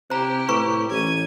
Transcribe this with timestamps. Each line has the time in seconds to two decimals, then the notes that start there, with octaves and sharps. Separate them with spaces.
0.10 C3 E4 G4 C5 A#5
0.49 A2 B4 A#5 C#6
0.90 A1 G#6 D#7